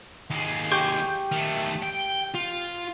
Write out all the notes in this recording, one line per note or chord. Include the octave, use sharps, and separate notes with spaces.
D#2 G#3
G4 C#6 G6
D#3 A3
G5
F4